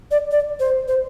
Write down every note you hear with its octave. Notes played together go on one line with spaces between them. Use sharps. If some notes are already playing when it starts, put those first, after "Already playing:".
D5
D5
C5
C5